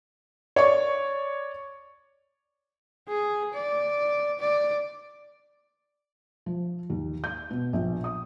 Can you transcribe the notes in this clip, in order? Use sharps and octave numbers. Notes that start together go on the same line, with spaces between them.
C#5 D5 C#6
G#4
D5
D5
F3
D#2
G6
B2
A#1
D#6